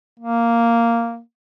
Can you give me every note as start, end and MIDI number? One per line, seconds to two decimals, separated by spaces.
0.20 1.20 58